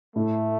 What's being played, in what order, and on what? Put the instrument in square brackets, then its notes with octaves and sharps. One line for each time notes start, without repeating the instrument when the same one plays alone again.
[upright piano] A2 [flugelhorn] A3